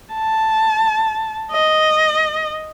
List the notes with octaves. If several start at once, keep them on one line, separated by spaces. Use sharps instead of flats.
A5
D#5